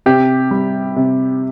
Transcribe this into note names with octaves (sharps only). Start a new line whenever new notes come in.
C3 G4
G3
C3